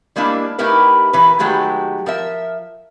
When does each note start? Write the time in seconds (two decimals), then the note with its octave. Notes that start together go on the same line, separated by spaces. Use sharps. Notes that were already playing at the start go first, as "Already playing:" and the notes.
0.16 G3 G#3 A#3 D4 E4
0.58 A3 D#4 E4 G4 A#4 B4
1.13 E3 A#4 B4
1.39 D#3 F#3 G#3 A3 G4 B4
2.06 F3 A#4 E5